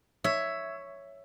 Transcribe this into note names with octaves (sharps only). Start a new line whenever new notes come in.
C#5 E5